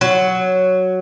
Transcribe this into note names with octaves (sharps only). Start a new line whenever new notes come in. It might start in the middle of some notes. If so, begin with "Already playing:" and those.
F#3